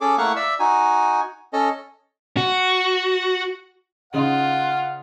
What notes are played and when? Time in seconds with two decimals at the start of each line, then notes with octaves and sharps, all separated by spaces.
0.01 C#4 G#4 A4 D6
0.18 A3 A#3 E4 F5 F#5 C#6
0.36 D5 E5 E6
0.60 D#4 F#4 G#5
1.53 C#4 A4 D#5
2.37 F#4
4.14 C#3 D#4 F4 F5 F#5